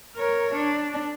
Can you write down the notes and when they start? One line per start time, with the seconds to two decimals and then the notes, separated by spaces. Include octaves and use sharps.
0.16 A#4 C#5
0.55 D4